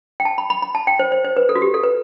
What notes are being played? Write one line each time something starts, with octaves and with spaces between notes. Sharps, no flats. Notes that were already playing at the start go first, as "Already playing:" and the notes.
G5
A5
B5
B5
B5
A5
G5
C5
C5
C5
B4
A4
F#4
G4
A4
B4